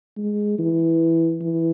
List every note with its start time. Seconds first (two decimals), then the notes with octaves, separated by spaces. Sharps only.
0.17 G#3
0.59 E3
1.42 E3